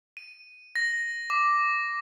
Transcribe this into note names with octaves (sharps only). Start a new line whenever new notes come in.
D#7
A#6
D6